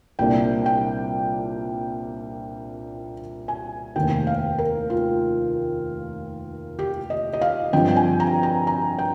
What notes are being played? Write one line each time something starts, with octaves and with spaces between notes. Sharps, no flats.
C2 A#2 G3 A#3 D4 G5
G5
G#5
F1 D#2 D#3 G5
F5
A#4
F4
G4
D#5
D#5
F5
G2 D3 F3 C4 G5
G5
G#5
A#5
A#5
A#5
G5